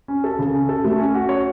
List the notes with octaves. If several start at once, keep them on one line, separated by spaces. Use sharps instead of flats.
C#4
A4
C#3
C#4
A4
A3
C#4
F#4
C#5